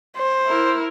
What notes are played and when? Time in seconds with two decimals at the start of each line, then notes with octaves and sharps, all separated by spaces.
0.17 C5
0.47 E4 A#4